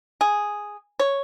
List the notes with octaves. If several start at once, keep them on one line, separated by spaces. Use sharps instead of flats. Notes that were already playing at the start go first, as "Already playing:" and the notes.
G#4
C#5